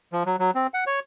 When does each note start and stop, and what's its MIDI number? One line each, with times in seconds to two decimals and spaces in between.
0.13 0.23 53
0.26 0.36 54
0.39 0.51 54
0.55 0.67 60
0.74 0.84 78
0.87 1.00 73